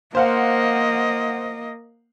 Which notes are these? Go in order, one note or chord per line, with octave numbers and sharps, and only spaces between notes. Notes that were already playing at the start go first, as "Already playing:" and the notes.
A#3 C5 D#5 F5 F#5